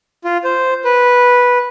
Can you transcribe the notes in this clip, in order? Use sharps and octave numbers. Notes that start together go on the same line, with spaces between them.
F4
C5
B4